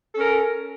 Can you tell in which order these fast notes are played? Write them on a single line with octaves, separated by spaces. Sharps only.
A4 C#4 A#4